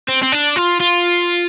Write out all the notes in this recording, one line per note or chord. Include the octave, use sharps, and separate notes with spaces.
C4
C4
D4
F4
F4